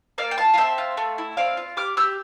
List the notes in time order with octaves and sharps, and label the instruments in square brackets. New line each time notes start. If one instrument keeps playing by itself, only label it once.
[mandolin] A#3 D5 F5
G5
F4 F5 A5
F5
C4 E5 G5
F4
A3
E4
C4 D5 F5
F4
G4 D6 F6
G4 E6 G6